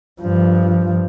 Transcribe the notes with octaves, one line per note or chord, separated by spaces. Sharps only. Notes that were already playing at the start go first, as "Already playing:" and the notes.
G2 F3